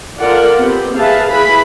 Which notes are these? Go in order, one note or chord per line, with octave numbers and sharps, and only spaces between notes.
F4 A4 A#4 D5 F#5
B3 C4 G4
G#4 B4 E5 F5 A5
E4 G#4 B4 B5